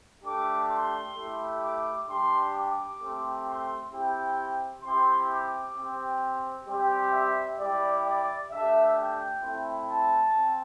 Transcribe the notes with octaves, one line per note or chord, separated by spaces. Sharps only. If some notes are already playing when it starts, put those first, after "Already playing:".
A3 D4 G4 D6
C6
A3 E4 G4
D6
G3 D4 G4 C6
D6
A3 C4 G4
C6
C4 E4 G4 G5
C4 E4 G4 C6
D6
C4 G4
G3 C4 G4
E5
G3 E4 G4 D5
D5
A3 D4 G4 E5
G5
A3 C4 E4
A5
C4